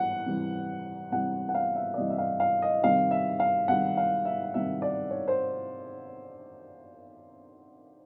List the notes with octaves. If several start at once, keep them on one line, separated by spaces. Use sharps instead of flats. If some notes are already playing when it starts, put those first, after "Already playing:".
Already playing: E3 G3 F#5
C3 E3 G3
C3 E3 G3 F#5
F#5
F5
E5
D5
C3 E3 G3 D#5
E5
F5
F5
D#5
C3 D#3 G3 F5
E5
F5
C3 D#3 G3 F#5
F5
E5
C3 D#3 G3 E5
D5
C#5
C5